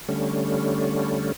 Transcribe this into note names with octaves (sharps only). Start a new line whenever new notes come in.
D3 G3 A3 C#4